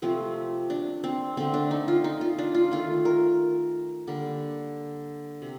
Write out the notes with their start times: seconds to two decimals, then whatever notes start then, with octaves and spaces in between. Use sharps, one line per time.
0.02 C3 F3 A3 C4
0.70 D4
1.04 C4
1.37 D3 A3 C4
1.54 D4
1.71 D#4
1.88 F4
2.04 D#4
2.21 F4
2.38 D4
2.55 F4
2.71 D#3 A3 F4
3.05 A#4
4.07 D3 G3 A#3
5.42 C3